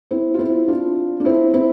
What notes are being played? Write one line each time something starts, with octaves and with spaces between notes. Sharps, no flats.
C4 E4
F4
C4 E4
D4 F4
D4
C4 E4
C4 E4